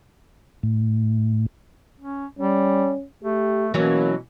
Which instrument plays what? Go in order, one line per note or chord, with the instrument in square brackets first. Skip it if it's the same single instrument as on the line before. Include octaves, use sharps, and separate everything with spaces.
[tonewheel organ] A2
[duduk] C#4
[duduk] G3 [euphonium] C#4
[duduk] A3 [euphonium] G4
[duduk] B2 [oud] E3 F#3 C#4 [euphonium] A#3